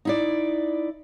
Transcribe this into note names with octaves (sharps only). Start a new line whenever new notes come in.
D#4 E4 D5